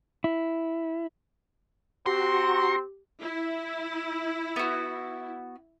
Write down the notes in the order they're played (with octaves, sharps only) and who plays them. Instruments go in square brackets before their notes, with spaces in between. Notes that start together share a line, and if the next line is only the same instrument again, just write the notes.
[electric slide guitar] E4
[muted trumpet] C4 [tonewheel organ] F#4 A#5 C#6 [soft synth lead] G4 [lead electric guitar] C6
[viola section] E4
[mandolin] B3 F#4